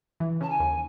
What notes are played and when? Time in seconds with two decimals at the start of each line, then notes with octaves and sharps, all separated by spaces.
0.20 E3
0.41 C#3 A5
0.49 G#5
0.60 D#2